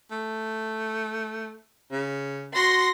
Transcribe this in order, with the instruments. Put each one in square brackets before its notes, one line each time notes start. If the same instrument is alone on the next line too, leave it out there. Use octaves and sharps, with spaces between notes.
[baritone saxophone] A3
C#3
[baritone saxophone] F#4 [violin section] C6 A#6